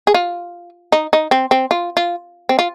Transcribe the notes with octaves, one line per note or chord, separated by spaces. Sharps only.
G#4
F4
D#4
D#4
C4
C4
F4
F4
C4
F4